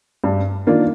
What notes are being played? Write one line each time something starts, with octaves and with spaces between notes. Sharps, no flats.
G2
D#3 A#3 D4 F4